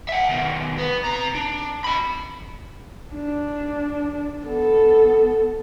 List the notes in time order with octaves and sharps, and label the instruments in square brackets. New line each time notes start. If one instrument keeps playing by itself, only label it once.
[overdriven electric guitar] E5 F#5
B2 D#3
B3
C3 A#5
D4
D#5 B5
[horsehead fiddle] D4
B3 A4